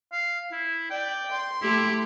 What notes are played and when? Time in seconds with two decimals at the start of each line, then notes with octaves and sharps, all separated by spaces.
0.12 F5
0.52 E4
0.90 D5 G5
1.31 C6
1.62 A3 E4 G4